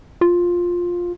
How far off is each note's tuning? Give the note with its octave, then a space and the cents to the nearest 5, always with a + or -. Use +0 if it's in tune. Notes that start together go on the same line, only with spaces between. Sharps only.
F4 +10